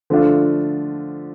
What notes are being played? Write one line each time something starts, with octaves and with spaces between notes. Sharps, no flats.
D3 F3 A3 D4 F4